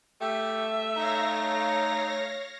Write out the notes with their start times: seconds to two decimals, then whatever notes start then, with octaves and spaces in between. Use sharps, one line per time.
0.21 A3 G4 E5
0.97 D#4 C#5 F5 A#6